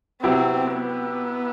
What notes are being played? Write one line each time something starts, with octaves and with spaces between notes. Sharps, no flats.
C3 F#3 B3 C4 E4 G4
B3